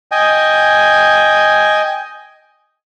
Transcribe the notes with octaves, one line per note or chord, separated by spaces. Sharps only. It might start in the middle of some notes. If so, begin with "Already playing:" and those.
D#5 G5 G#5